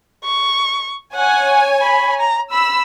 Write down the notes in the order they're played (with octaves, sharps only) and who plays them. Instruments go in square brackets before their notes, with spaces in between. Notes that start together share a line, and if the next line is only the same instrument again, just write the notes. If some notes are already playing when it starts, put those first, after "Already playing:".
[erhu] C#6
[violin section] C#5 G#5 [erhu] F#5
[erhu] B5
A#5
[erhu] B5 [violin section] E6